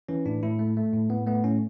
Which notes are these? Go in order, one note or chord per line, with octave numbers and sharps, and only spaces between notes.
E3 C#4
A2 D4
A2 E4
A3
A3
A2
A2 B3
A3 B3
A2 C#4